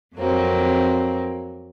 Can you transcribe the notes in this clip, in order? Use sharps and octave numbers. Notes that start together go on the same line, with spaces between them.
F2 F#3 A#3 C4